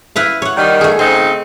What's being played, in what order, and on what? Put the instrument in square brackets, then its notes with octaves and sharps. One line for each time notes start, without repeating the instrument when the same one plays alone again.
[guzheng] E4 B4 F5
C#5 F#5
[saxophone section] D#3 G3
[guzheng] A3 G#4
[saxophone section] C#3 C4 D#4 [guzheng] C5